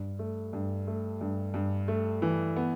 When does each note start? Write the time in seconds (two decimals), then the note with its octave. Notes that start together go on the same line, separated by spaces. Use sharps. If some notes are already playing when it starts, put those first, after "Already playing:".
Already playing: G2
0.19 A3
0.53 G2
0.87 A3
1.21 G2
1.54 G2
1.88 A3
2.22 E3
2.56 B3